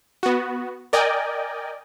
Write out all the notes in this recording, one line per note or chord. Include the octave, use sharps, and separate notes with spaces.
B3 F#4
A#4 D5 D#5 G5 G#5